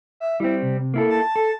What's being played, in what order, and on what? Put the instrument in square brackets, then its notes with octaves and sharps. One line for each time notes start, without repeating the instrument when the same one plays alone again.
[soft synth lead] E5
[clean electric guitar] G3 C4 [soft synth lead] E4
[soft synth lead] C3
[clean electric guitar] A#3 E4 A4
[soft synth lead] A5
[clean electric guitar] A4